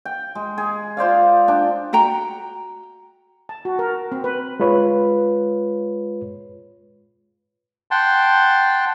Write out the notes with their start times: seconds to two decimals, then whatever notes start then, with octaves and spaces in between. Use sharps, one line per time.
0.05 G5
0.35 G#3
0.58 G#4
0.97 F4 C5 D5 F5
1.48 D4 G5
1.93 F#4 F#5 G5 A#5
3.49 A5
3.65 F#4
3.79 A#4
4.12 C4
4.24 B4
4.60 G#3 F4 B4 C#5
7.91 F#5 G5 A5 C6